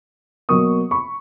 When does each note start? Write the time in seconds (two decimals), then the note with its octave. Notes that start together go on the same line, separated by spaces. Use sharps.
0.49 B2 F#3 A#3 C#6 D#6
0.91 B5 C#6